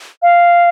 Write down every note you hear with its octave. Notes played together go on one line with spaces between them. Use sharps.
F5